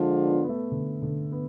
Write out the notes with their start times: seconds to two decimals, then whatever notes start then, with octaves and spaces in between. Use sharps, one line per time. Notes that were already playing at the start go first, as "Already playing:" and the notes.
Already playing: D3 F3 G#3 D4 F4
0.27 B3
0.44 B3
0.49 A3
0.72 D3
1.02 D3
1.32 B3